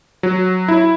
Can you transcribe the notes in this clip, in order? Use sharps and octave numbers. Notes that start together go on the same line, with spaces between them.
F#3
E4